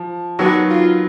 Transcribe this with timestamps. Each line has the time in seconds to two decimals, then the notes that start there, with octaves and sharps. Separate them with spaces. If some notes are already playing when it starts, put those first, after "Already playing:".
Already playing: F3
0.39 D#3 F#3 B3 F#4
0.71 F4